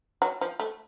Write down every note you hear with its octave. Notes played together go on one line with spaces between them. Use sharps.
F#3
F3
A3